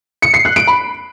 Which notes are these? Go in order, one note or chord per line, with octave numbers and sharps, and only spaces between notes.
C#7
C7
F#6
D7
B5